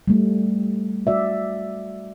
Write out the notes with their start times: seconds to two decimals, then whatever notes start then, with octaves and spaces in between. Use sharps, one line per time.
0.08 G3 A3
1.07 G3 F#4 D5 E5